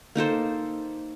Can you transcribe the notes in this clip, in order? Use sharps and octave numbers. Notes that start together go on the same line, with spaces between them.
A#3 D#4 A4 C5